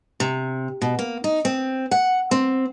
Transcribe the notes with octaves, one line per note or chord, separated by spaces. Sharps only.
C3
B2
A#3
D#4
C4
F#5
C4